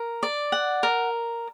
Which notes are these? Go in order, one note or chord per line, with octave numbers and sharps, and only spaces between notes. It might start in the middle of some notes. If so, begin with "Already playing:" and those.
Already playing: A#4
D5
F#5
A#4